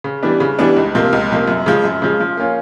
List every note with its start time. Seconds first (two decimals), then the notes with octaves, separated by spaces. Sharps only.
0.04 C#3
0.23 E3 G3 B3 D4
0.40 C#3
0.59 E3 G3 B3 D4
0.77 C#2
0.95 C3 F3 A#3
1.13 C#2
1.31 C3 F3 A#3
1.47 F#2
1.66 C#3 F3 G#3
1.84 F#2
2.02 C#3 F3 G#3
2.20 F3
2.37 A#3 C#4 F4